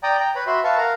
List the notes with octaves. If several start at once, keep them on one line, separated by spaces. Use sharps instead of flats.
D5 G5 A#5 D#6
G5 A#5
B4 C#5 B5
F#4 E5 B5 C6
B4 E5 F5 A5 C#6
A#4 F5 F#5 A#5